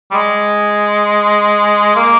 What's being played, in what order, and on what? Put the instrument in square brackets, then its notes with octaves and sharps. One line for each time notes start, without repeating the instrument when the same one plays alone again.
[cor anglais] G3
G#3
A#3